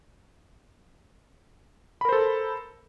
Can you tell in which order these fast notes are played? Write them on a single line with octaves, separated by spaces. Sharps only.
B5 A#4 C5 A4